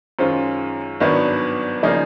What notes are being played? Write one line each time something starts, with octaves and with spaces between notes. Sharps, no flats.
F#2 D#3 G#3 C#4 F4 C5
G#1 G2 D#3 F#3 B3 D5
C#3 F3 A#3 D#4 G#4 D5